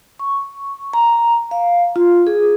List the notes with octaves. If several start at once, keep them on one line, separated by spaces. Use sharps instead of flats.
C#6
A#5
F5
F4
G#4